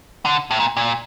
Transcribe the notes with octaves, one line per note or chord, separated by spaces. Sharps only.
D3
A2
A#2
A#2